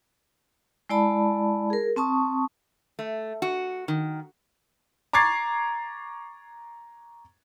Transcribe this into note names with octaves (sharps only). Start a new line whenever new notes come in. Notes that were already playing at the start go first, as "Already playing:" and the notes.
G#3 E4 D5 A5 B5
G#4 A#4
C4 A5 C#6 D#6
A3
F#4
D#3
A#5 C#6 D6 G#6 A6 C7